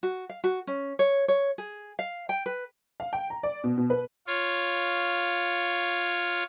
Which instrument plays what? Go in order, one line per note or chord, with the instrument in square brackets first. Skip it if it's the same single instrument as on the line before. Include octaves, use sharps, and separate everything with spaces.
[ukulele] F#4
F5
F#4
C#4
C#5
C#5
G#4
F5
G5
B4
[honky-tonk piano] F5
G5
A#5
D5
B2
B2
B4
[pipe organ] F4 C#5